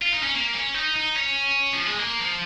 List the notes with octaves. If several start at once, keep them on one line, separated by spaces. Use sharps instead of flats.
F4
D#4
C#4
A#3
C#4
D#4
D#4
C#4
F3
G#3
A#3
F3